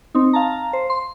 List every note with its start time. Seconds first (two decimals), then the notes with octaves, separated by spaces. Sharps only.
0.15 C4 D#4
0.33 F5 A5 A#5
0.73 C5
0.90 C6